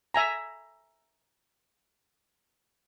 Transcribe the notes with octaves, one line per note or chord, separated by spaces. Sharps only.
E5 G#5 A#5